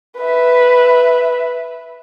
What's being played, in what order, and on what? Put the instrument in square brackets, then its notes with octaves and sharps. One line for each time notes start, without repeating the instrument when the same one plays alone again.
[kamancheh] B4 E5